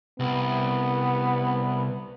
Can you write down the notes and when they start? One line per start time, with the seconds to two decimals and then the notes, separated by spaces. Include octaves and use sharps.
0.20 C2 B3